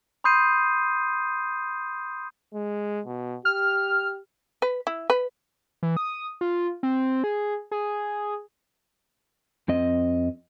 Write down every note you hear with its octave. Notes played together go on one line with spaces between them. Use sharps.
B5 C6 D#6 G6 C7 D#7
G#3
B2
G4 F6
B4
E4
B4
E3
D#6
F4
C4
G#4
G#4
F2 C4 D#5